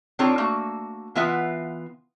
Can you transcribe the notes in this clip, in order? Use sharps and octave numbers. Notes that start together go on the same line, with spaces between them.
C4 D4 D#4 F4 A4 C#5
A3 A#3 F#4
E3 B3 F4 B4 E5 F#5